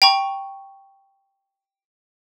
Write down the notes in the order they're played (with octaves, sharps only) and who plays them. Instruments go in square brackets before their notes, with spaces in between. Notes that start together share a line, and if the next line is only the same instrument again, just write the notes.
[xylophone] G5 A#5 C#6